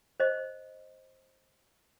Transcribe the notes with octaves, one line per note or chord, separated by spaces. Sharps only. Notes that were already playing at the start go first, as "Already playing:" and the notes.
C5 D#5